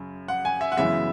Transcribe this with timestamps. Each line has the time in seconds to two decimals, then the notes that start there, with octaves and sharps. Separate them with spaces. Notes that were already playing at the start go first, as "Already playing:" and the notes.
Already playing: F#2 C#3
0.28 F#5
0.45 G#5
0.61 E5
0.72 F#5
0.77 F#2 C#3 E3 G#3 B3 E5